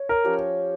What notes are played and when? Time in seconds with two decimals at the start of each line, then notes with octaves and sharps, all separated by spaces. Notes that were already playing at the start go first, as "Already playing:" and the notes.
Already playing: C#5
0.09 A#4
0.24 F3 C#4 G4 C#5